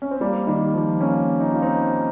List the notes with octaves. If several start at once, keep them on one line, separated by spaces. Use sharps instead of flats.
C#4
C4
G3 A#3
D#3 G3
F3
A#3 C#4
D#4
F4
C4 D#4